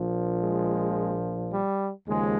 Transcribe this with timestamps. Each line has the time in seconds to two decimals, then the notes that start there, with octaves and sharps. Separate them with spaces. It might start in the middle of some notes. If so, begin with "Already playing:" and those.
Already playing: A#1 A#2 F3
0.41 G#3
1.52 G3
2.08 D#2 C#3 F3 G#3